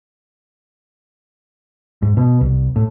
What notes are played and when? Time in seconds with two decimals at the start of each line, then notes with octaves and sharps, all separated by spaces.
2.02 G#2
2.17 B2
2.41 C2
2.76 A2